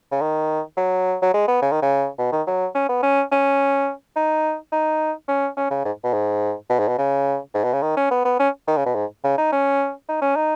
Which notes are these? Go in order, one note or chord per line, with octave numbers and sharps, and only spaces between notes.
C#3
D#3
F#3
F#3
G#3
B3
C#3
D#3
C#3
B2
D#3
F#3
C#4
B3
C#4
C#4
D#4
D#4
C#4
C#4
C#3
G#2
B2
G#2
B2
G#2
B2
C#3
G#2
B2
C#3
D#3
C#4
B3
B3
C#4
D#3
C#3
B2
G#2
C#3
D#4
C#4
D#4
C#4
D#4